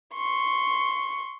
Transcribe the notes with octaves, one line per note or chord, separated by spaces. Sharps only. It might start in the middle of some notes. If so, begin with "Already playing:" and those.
C6 C#6